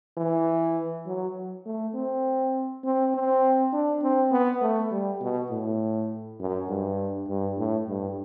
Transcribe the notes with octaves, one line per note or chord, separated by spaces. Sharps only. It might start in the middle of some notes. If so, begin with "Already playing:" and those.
E3
F#3
A3
C4
C4
C4
D4
C4
B3
A3
G3
B2
A2
F#2
G2
G2
A2
G2